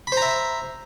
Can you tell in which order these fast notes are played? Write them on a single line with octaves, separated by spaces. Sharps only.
B5 C5 A#5 E5